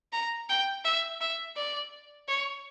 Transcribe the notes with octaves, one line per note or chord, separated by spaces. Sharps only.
A#5
G5
E5
E5
D5
C#5